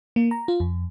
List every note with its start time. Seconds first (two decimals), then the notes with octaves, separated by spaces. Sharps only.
0.16 A#3
0.31 A#5
0.48 F4
0.60 F2